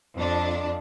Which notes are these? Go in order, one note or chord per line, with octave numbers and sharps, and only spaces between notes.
F2 D4